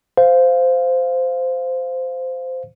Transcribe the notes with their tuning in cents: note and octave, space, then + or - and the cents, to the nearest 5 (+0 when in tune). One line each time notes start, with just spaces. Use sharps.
C5 -15 F5 +0